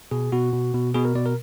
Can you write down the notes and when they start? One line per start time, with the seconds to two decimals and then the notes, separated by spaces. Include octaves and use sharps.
0.11 B2 G#4
0.32 B2 F#4
0.53 B2
0.74 B2
0.94 B2 G#4
1.05 A#4
1.15 B2 D5
1.26 A#4